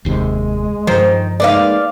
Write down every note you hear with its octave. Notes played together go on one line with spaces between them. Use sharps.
F1 D#2 C3 G#3
G2 D#3 F3 C5
G#3 A#3 B3 D#4 D5 F5